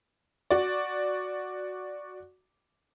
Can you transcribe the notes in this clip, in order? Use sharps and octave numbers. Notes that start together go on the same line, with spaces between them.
F#4 D5